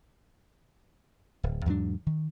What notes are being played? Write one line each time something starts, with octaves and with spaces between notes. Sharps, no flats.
D1
E2 G#2 F#3 D4
D#3